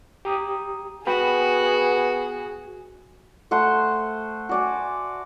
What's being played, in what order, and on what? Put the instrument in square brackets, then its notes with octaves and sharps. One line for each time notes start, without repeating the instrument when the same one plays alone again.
[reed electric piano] G4 A#5 D#6
[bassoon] B3 [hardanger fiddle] F#4 [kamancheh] G#4 [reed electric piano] G5 B5
[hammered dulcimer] A3 C5 F#5 C6
F#4 D5 G#5